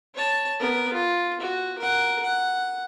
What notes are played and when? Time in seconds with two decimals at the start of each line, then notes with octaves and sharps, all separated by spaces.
0.15 C#5 A5
0.60 B3 A#4
0.93 F4
1.41 F#4
1.78 A#4 F#5
2.23 F#5